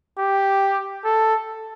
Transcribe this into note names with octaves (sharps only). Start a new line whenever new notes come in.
G4
A4